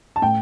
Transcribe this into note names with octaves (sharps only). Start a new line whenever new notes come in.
A5
A2 G5